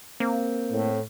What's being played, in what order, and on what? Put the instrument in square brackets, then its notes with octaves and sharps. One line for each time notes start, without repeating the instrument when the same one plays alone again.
[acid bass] A#3 [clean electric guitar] C4
[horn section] A2